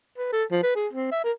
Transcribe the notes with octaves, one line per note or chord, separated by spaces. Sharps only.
B4
A4
F3
B4
G#4
C4
E5
A#4